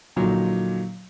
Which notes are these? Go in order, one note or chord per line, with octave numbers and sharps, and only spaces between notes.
A#2 D3 F3 F#3 D#4